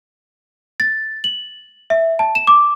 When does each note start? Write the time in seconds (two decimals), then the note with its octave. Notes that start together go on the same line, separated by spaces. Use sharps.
0.80 A6
1.24 F#7
1.90 E5
2.19 A5
2.35 E7
2.47 D6